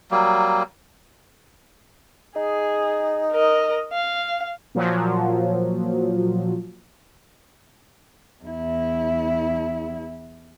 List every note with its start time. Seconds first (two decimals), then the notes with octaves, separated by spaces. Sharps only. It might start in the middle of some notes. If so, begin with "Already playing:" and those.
0.11 F#3 G3 A#3
2.36 D#4 G#4
3.31 A#4 D#5
3.93 F5
4.75 A#2 F3 F#3
8.44 E2 E4